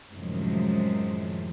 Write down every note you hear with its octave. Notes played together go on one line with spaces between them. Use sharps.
F#2 A2 C3 D#3 F3 G#3